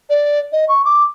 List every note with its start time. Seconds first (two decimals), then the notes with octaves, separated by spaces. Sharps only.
0.10 D5
0.52 D#5
0.69 C#6
0.85 D6